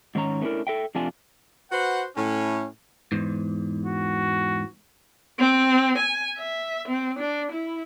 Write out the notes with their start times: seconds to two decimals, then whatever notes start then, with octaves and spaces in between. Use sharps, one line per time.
0.15 G#2 D#3 C#4 C#5 A#5
0.42 A3 B3 C#4 D4 E4 A#4
0.67 A4 E5 G5
0.95 F2 C3 A3 D4 F4 G#5
1.71 F#4 B4 C5 F#5
2.16 A2 C#4
3.12 E2 G#2
3.85 F#4
5.39 C4
5.98 G#5
6.37 E5
6.88 C4
7.19 D4
7.51 E4